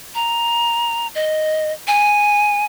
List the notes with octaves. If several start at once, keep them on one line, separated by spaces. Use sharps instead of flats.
A#5
D#5
G#5